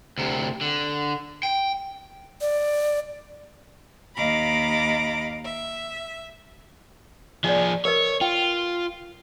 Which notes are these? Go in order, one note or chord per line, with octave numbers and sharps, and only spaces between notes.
D2 C3
D3
G5
D5
D#2 D#5 F5 A#5 B5 D6
E5
F3 G#4 D5 D#5
A#4 B4 C#5 D#5
F4 G5